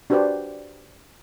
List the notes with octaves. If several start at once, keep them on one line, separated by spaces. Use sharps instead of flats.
D4 F#4 G4 B4 C5 D5